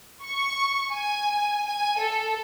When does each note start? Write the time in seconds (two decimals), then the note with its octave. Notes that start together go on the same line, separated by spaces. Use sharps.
0.24 C#6
0.91 G#5
1.67 G#5
1.99 A4